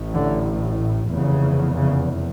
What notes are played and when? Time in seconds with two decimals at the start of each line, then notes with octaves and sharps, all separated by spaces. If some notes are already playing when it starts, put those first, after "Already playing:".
Already playing: A1 A2
0.14 D3
1.12 F1 E2 C#3
1.76 C#3